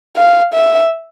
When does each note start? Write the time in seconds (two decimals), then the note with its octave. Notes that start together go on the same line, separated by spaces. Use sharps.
0.16 F5
0.54 E5